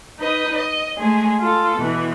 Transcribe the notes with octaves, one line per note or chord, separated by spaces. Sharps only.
D#4 B4 D#5
D#5
G#3 A3 G#4
F4 A4
B2 E3